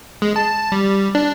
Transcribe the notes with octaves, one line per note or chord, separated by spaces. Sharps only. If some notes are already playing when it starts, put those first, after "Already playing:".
G#3
A5
G3
D4